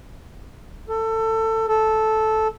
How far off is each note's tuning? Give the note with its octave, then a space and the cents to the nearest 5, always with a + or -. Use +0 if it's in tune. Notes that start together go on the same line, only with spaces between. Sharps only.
A4 +20
A4 -10